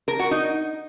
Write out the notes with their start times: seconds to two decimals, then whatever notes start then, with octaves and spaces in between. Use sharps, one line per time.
0.08 A#4
0.19 F#4
0.31 D#4